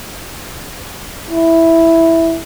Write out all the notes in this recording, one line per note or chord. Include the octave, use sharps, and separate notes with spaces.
E4